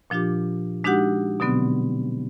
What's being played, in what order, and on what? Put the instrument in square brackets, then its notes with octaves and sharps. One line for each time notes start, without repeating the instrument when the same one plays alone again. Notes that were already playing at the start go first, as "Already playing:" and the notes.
[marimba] A#2 F3 D4 F4 G4
G#3 D4 D#4 F#4 G4 F#5
B2 D3 F#3 B3 C4